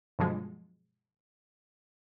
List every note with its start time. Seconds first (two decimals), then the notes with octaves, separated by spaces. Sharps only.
0.19 G2 B2 D3 F3 F#3 G#3